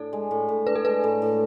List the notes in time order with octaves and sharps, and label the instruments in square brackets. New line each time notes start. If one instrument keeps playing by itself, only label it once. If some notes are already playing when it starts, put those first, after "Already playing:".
Already playing: [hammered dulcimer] A2 D4 [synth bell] A4
[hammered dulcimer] G#3
A2
A2
[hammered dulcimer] D4 [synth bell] B4
[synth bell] A4
[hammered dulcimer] G#3 [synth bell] B4
[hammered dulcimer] A2
A2